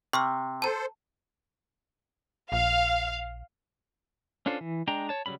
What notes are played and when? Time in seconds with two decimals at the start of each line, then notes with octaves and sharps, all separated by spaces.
0.13 C3 C#6 E6 F6
0.62 A4 C5 A5 A#5
2.52 A#1 F5
4.46 C#4 D4 F4 A4 C5
4.60 E3
4.87 G#3 D4 G5 A#5
5.09 C#5 A5
5.26 C#3 F#3 G3 C#4 B5